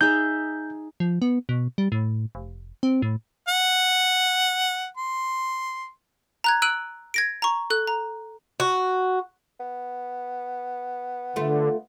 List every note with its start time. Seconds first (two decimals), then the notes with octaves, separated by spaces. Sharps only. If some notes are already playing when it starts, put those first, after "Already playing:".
0.01 D#4 G#4 E5 G6
1.00 F3
1.22 B3
1.49 B2
1.78 G3
1.92 A2
2.35 F1
2.83 C4
3.02 A2
3.48 F#5
4.97 C6
6.44 A#5 F#6 G#6
6.62 E6 F#6 D7 D#7 F#7
7.14 G#6 A#6 D7
7.42 A#5 C#6
7.70 A4 F#6
7.87 A#5
8.60 F#4
9.60 B3
11.36 D3 A3 F4